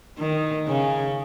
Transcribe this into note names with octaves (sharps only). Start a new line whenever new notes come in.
D#3
C#3